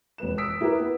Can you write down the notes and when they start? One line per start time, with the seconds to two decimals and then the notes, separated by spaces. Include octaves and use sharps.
0.18 E1 F2 B4 E7
0.38 D#6 E6 B6 D7
0.61 E4 G4 A#4 B4
0.80 B3